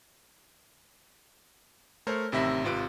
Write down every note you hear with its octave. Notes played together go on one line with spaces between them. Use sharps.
A3 A#4 C5 C#5
A1 C3 D#3 E5 B5 A#6
G#1 C3 F4 B4 D7